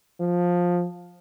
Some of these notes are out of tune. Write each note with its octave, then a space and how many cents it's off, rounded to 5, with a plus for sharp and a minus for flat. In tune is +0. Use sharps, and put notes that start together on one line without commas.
F3 +15